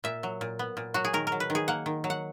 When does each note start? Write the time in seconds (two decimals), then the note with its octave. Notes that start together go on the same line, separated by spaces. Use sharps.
0.04 A#2 E5
0.23 F#3
0.41 A#2
0.59 B3
0.77 A#2
0.94 F#3 F#4
1.05 G#4
1.13 D#3 A#4
1.27 A#4
1.32 F#3
1.40 B4
1.50 D#3
1.55 G#4
1.68 A#3 F#5
1.86 D#3
2.04 F#3
2.10 F#5